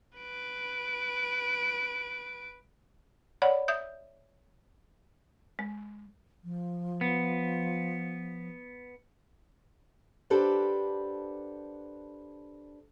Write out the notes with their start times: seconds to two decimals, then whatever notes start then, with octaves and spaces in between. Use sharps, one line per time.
0.18 B4 D7
3.42 C#5 D5 F#5 B5
3.68 E5 D#6 G6
5.59 G#3
6.44 F3
7.01 B3
10.30 D4 G4 A4 B4 C5 F#5